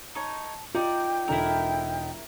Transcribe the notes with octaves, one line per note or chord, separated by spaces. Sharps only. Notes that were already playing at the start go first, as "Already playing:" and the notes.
D#4 C#5 A5
D#4 F4 A#4 D5 G5
E1 D#4 E4 A4 A#4